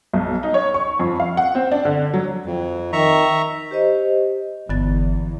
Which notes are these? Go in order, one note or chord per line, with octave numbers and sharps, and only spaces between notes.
B1
D#4
C#5
C#6
F2
F5
F#5
C4
D4
D3
F#3
F2
D#3 E5 A#5 C#6
G4 C5 D#5
G1 E2 D3 B3 A6